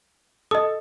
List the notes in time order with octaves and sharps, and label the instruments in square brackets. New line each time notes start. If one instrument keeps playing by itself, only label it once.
[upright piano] A4 [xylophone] D#5 D#6